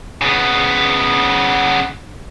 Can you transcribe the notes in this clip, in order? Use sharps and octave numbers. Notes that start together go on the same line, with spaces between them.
C#3 B3